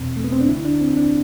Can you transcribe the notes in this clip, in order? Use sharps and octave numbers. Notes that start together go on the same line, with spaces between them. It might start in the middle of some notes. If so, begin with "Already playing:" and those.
Already playing: E2 B2 C4
A3
B3
C4
D4
D2 D3 E4
D4
C4
D4